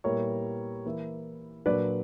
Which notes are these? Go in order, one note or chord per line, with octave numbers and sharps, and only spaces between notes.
A#2 G3 B3 E4 A#4 C#5
E3 A#3 E4
A#2 F#3 A#3 D4 B4 D5